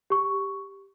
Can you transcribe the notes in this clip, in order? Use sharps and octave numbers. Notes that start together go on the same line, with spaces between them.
G4 C#6